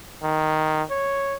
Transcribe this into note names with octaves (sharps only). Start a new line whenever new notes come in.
D#3
C#5